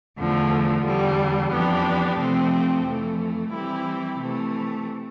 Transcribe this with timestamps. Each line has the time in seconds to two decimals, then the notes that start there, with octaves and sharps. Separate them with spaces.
0.18 E2 D3 F3 A3
0.85 E2 D3 G3
1.52 F2 E3 B3 D4 G4
2.19 C3 F3 A3 C4
2.85 F2 E3 A3
3.52 E3 G3 C4 E4 G4
4.19 C3 E3 A3